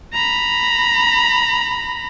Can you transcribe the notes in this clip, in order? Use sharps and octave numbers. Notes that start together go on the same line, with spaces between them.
A#5 B5